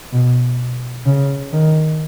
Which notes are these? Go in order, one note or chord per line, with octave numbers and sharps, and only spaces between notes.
B2
C#3
D#3